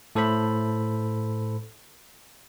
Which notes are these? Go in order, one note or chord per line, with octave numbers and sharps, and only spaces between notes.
A2 A4 C5 B5